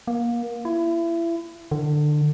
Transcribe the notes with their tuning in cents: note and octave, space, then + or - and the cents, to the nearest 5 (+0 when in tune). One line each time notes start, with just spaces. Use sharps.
A#3 +25
E4 +30
D3 +25